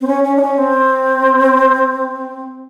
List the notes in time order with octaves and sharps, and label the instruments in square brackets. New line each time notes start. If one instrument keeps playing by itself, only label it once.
[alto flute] C4
C#4
C#4
D4
C#4
C4